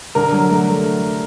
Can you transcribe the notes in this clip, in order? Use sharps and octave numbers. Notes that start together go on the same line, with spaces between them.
D3 A#4
F#3
A3
F#3